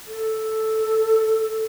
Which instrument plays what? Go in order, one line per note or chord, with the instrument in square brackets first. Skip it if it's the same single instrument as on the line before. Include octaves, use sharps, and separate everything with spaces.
[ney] A4